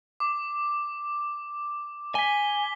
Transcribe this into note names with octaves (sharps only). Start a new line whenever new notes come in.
D6
G#5 B6 G7